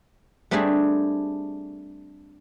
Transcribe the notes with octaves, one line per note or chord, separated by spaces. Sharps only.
G3 A3 C4 D4 G4 G#4